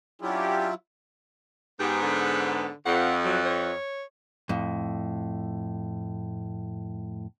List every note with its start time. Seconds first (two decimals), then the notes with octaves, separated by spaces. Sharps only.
0.22 F#3 C#4 D4 E4 F4 G4
1.80 G#2 B3 G4
2.02 D3
2.86 F2 F#5
3.25 F#3
3.45 C#5
4.49 F2 A2